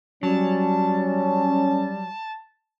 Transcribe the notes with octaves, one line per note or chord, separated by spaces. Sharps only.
F#3 G3 C#4 A5